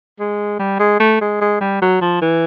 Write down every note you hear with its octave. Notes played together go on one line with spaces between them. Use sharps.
G#3
G3
G#3
A3
G#3
G#3
G3
F#3
F3
E3